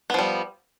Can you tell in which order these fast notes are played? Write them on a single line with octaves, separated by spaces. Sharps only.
B3 F3 G3